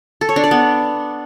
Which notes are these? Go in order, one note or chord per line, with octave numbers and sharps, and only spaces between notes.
A4
C#5
D4
D5
B3